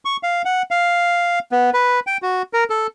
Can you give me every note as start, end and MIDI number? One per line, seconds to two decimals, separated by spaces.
0.05 0.17 85
0.23 0.42 77
0.45 0.62 78
0.71 1.39 77
1.52 1.70 59
1.73 2.00 71
2.07 2.17 79
2.22 2.42 66
2.53 2.64 70
2.70 2.87 69